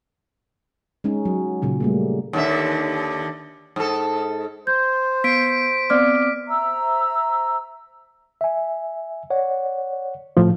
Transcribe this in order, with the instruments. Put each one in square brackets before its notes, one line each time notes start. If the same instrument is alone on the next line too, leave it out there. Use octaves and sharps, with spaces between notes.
[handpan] G#3 C#4 D#4
F#3
A#2 C#3 F#3
G3 A3 A#3
[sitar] D#2 D3 E5
G#2 A4
[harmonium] C5 [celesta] G6
[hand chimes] B3 C7 [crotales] B6 D7
[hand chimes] B3 C4 D6 [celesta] D5 F6
[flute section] C5 E5 A#5 E6
[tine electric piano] E5 G#5
C#5 D5 F#5
[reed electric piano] A2 F3